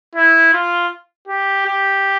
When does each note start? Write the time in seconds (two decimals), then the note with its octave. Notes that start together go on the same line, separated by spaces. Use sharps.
0.15 E4
0.53 F4
1.28 G4
1.66 G4